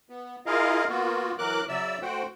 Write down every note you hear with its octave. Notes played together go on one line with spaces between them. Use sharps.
B3
E4 F4 G#4 A#4 D#5 F5
A#3 B3 F4 F#4
E3 F#3 A#4 D6 F#6
C#3 F#3 D5 E5 E6
A3 F#4 C5 F#5 G5